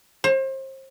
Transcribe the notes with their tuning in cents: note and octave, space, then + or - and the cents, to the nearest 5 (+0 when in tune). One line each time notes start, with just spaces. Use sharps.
C5 +35